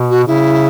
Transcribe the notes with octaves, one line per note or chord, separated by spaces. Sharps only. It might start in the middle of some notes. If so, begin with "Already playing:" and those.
Already playing: B2
F#4
C#3 E4